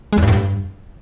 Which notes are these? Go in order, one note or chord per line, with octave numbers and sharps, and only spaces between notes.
G#3
E2
G2
A2
G2